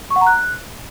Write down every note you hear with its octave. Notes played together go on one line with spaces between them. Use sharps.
C#6
F#5
A#5
F#6